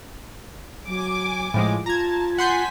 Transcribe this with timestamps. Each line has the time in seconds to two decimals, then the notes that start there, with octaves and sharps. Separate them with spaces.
0.87 F#3 G#5 D6
1.54 A2 F3 G#3
1.86 F4 A5 A#5 G#6
2.38 F#5 G#5 A5 C6 G6 B6